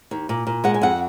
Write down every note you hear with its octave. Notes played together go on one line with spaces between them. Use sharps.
D#2
A#2
A#2
G#3 F#5
G#5
F2 F#5